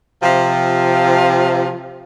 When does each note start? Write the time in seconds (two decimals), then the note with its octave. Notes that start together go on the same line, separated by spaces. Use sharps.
0.22 C3 F3